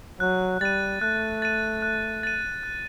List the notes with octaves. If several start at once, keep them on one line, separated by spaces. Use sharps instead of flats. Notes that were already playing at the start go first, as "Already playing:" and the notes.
F#3 F#6
G3 A6 D#7
A3 F#6
A6 D#7
F#6
A6 D#7
F#6